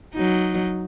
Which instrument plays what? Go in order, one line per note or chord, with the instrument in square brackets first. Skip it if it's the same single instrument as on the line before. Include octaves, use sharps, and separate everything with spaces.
[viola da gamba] F#3 D#4